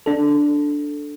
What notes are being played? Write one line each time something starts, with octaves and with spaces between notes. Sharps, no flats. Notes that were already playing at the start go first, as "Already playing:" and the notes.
D4 A4